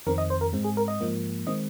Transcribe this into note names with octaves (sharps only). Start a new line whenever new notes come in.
F2 D#3 C4 A#4
D#5
C5
A#4
G#2 G#3 C4
G#4
A#4
D#5
G#2 F3 A#3
D#3 G#3 C4 D#5